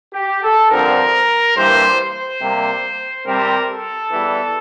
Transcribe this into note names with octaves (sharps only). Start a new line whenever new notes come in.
G4
A4
G2 D3 F3 C4 A#4
G2 E3 G3 A#3 C5
C5
C3 G3 A#3
C3 G3 C4 A#4
A4
E2 E3 G3